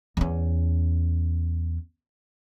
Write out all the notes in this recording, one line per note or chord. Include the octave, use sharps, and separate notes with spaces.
E2 C#4